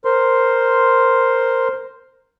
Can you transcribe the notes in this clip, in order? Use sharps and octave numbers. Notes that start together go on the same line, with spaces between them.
A#4 C5 C6